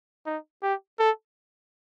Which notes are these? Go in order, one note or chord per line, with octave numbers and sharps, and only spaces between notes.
D#4
G4
A4